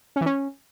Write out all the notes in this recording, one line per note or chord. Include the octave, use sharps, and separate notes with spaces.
C#4
E3
C#4